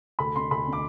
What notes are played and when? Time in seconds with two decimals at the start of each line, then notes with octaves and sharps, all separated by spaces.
0.19 D2 B5
0.36 D3 C6
0.51 D2 B5
0.67 D3
0.73 D6